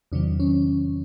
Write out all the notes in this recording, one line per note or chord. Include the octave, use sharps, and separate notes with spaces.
E2 C3 D#3 F#3 D4
C#4